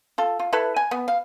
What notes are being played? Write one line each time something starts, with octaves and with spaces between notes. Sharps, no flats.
F4 A4
F4
E4 A4 B4
G#5
B3
F5